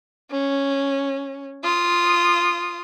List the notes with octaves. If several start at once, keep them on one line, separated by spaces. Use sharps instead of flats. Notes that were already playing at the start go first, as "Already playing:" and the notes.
C#4
F4 D#6